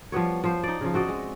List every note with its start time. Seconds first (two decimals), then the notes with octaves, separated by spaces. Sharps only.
0.12 F3 G3 B3 C#5
0.44 F3 C5
0.63 D#4 D5
0.81 C#3 F3
0.94 C4 F#4 D5 D#5
1.08 G#3